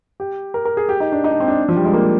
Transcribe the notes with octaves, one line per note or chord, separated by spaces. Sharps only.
G4
A#4
A#4
G#4
G4
D#4
D4
D#4
D4
C4
D4
F3
G3
G#3
A#3